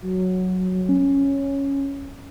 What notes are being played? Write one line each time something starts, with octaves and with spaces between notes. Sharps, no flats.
F#3
C#4